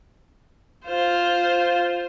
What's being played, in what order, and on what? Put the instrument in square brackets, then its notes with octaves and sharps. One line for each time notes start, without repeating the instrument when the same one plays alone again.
[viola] F4 C5